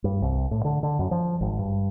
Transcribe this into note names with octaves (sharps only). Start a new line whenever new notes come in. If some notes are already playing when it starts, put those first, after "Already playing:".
G2
C2
A2
D3
D3
F#2
F3
G#1
G2